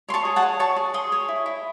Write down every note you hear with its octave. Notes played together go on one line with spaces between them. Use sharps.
C#5 C6
A5 C#6
G#4
F#5 A5
C#5
C#5 A5 C#6
G#4
G#4 C6 D#6
C#5
E4
E4